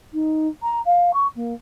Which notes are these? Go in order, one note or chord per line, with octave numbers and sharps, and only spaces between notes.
D#4
A#5
F5
C#6
A#3